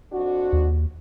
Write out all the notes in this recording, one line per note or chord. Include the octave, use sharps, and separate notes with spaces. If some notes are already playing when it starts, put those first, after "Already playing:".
F2 D4 F#4
D#2